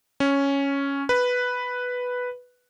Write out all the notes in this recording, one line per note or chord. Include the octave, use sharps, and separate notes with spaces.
C#4
B4